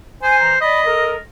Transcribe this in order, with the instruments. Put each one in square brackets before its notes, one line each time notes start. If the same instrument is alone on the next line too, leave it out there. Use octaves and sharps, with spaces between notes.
[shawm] C5 [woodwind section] G#5
[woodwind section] E3 A#5
[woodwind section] D5 B5 [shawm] D#5
[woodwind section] A4 A#4